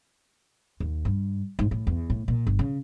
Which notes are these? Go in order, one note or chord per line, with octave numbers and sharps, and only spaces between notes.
D#2
G2
G#2
A2
E2
A2
A#2
G1
C#3